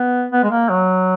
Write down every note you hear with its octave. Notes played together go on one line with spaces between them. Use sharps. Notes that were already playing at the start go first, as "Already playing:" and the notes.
Already playing: B3
B3
G#3
A#3
F#3